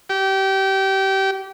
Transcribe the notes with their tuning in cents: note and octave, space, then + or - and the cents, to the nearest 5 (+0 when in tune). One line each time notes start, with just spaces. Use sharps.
G4 -25